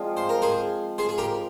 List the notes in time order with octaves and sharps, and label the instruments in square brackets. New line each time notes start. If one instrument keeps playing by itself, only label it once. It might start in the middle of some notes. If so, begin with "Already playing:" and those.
Already playing: [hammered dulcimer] F3 G#3 C4 F4
[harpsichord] C5
A#4
G#4 C5
G#4 C5
G#4
G4 A#4